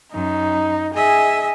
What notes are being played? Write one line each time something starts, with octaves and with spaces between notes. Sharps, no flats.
F#2 D#4
G#4 D#5 E5